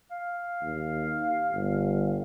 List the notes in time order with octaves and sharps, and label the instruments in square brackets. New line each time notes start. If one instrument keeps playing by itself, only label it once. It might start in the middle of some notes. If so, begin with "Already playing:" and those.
[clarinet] F5
[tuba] D#2
G1